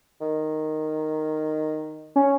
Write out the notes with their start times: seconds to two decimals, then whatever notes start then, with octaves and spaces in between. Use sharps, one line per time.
0.21 D#3
2.16 C#4